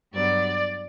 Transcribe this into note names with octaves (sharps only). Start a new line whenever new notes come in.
G2 F#3 B3 D5